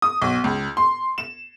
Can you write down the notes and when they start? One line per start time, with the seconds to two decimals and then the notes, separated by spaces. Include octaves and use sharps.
0.02 D#6
0.22 B1
0.44 C#2
0.77 C6
1.18 E7